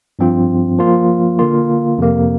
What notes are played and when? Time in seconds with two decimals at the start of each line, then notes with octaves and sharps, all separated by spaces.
0.19 G2 F3 C4 F4
0.78 F3 A#3 F4
1.39 D3 A#3 F4
1.98 F2 C3 A#3